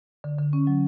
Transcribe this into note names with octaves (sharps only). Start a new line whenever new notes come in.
D3
D3
C#4
F#3